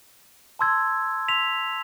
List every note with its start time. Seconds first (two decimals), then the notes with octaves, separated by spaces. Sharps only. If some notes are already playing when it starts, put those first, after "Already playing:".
0.59 A5 C6 E6 G#6
1.28 C6 E6 B6 F7